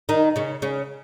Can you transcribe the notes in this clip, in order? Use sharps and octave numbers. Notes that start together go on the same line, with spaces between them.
D#3 D#4
C#3 C#4
C#3 C#4